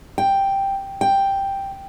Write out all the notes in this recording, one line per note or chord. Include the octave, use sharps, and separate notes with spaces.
G5
G5